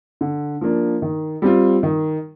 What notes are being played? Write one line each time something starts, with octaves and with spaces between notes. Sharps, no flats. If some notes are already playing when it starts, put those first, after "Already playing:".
D3
F3 A#3 D4
D#3
G3 C4 F4
D#3